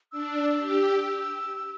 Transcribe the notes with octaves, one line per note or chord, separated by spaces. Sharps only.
D4 E6
G4